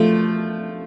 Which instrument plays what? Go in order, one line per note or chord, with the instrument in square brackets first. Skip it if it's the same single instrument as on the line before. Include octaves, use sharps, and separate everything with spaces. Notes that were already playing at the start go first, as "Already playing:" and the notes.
Already playing: [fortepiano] F3 A3